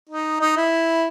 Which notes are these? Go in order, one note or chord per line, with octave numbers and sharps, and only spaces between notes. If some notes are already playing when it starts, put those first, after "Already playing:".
D#4
D#4
E4